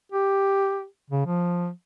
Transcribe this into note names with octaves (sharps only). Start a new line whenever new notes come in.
G4
C#3
F3